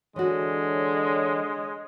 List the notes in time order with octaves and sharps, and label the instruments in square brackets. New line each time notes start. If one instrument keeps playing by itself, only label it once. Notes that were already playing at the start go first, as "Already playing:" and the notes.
[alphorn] D3 [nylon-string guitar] E3 F#4 [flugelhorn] G#3 [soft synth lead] C#5